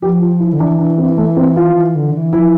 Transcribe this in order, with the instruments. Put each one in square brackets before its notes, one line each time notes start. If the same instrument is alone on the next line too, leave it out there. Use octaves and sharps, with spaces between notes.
[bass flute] F3 [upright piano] G4
[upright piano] F4
E4
[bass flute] D3
[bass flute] E3 [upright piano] D4
[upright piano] D4
C4
A3
C4
F4
[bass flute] E3
D3
E3
[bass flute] F3 [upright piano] E4